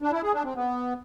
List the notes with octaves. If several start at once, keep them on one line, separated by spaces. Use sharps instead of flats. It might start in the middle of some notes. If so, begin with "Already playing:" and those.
D4
E4
G#4
D4
C4
B3